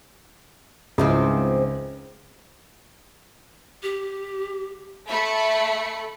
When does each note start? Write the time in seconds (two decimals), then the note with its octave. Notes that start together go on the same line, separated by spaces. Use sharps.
0.98 C#2 G#2 F3 C4 E4
3.83 G4
5.08 A3 E5 B5 C#7